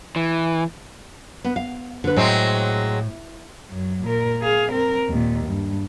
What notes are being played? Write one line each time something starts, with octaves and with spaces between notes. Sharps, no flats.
E3
B3
F5
D3 B4
A2 F#3 G#3 C4
F#2 F#3
A#2 A#4
G#4 F5
C4 A#4
D#2 A#2
G2